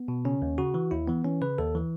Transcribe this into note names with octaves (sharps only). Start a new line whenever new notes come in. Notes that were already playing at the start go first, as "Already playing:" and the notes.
Already playing: B3
B2
C#3 C#4
D#2
C#3 F#4
E3
D#2 E4
E3 B3
E3 C#4
C#3 B4
D#2 A4
E3